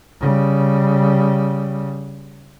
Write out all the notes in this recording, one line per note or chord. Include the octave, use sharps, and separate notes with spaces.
C#3 G3